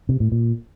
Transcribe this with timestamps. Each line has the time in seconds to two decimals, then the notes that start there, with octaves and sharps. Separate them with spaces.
0.09 C3
0.20 A2
0.32 A#2